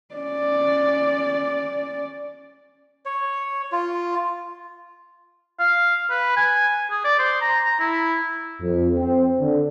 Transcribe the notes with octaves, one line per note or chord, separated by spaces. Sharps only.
C#4 D5
C#5
F4
F5
B4
G#5
G#4
D5
C5
A#5
A#5
E4
F2
C4
D3